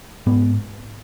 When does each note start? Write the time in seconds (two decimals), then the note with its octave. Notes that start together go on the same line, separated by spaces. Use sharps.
0.26 G#2 B3